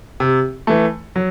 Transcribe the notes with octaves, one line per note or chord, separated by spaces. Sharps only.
C3
E3 A3
F#3